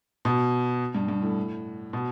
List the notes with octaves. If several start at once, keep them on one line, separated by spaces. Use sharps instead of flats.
B2
G2
G2
A2
B2